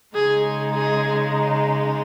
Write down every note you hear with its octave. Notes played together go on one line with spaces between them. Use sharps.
C#3 G#3 D#4 G#4
G#4